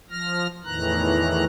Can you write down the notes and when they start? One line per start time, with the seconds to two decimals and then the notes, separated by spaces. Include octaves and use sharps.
0.10 F3 F6 A#6
0.64 E2 A2 D#3 E3 A#5 F#6